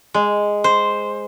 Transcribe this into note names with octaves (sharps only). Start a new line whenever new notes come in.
G#3
C5